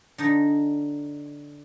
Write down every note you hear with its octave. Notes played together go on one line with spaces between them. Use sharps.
D3 D#4